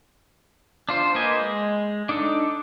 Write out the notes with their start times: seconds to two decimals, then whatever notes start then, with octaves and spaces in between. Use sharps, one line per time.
0.89 D4 F4 C5
1.15 A#3 B4 C5 D#5 G#5
1.39 G#3
2.09 D4 D#4 A4